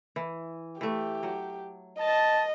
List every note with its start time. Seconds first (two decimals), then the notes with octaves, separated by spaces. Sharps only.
0.16 E3
0.81 E3 A3 G4
1.23 F#3
1.99 D#5 A5